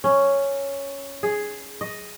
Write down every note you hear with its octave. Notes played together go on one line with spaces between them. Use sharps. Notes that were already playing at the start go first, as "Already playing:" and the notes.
C#4
G#4
D#5